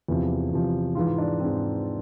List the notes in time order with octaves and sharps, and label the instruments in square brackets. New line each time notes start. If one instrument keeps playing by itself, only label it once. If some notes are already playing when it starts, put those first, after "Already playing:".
[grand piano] E2 C3 F3 E4
E2 C3 F3
G#2 E3 F4
D4
G#2 E3 C4